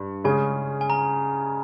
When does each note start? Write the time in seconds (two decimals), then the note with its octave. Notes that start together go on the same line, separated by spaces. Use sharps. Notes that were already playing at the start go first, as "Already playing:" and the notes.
Already playing: G2
0.24 C#3 G#3 C#4 G#4 G#5
0.81 G#5
0.90 A#5